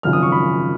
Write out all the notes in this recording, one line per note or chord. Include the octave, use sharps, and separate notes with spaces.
G#1 F#2 C#3 F3 F6
D#6
C#6
B5